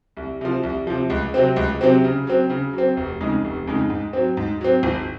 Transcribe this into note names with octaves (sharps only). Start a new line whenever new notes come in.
C2
C3 F3
C2
C3 F3
C#2
C3 F#3 C4
C#2
C3 F#3 C4
C#3
F#3 C4
C#3
F#3
C4
F1
F2 C#3 G#3 D#4
F1
F2 C#3 G#3 D#4
G#2
F#3 C4
G#2
F#3 C4
G#1